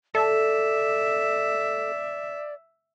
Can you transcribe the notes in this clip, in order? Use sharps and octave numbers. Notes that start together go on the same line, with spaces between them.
A4 D5 E5